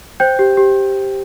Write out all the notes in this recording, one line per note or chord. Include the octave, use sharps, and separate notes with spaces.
C5 G5 G6
G4
G4